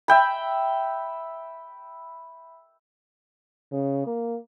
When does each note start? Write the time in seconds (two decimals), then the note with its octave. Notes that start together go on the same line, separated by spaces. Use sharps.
0.08 E5 G5 B5
3.72 C#3
4.06 A#3